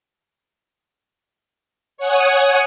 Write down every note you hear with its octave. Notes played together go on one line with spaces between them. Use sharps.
C#5 F#5 G#5 D#6